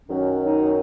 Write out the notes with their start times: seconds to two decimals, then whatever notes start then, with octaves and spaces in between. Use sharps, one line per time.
0.09 F#2 D#3 F#3 C#4
0.42 D#4